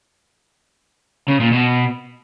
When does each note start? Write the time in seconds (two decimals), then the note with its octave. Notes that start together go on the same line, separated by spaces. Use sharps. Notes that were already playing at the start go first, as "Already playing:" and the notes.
1.28 C#3
1.40 A#2
1.52 B2